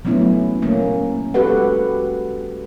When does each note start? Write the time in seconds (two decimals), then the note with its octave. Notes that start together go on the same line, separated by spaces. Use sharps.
0.05 F#3 A3 B3 C#4 E4
0.62 A#3 C#4
1.34 G#3 F#4 G4 A4 B4 F#5